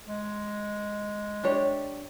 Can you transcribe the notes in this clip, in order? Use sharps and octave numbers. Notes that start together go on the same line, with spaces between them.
G#3
D4 G4 C#5